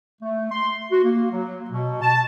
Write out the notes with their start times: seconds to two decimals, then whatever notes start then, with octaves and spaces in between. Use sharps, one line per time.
0.21 A3
0.51 C6
0.92 F#4
1.04 A#3
1.32 F#3
1.71 B2
2.02 A5